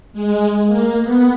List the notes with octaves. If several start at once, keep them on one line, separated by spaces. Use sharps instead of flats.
G#3
A#3
B3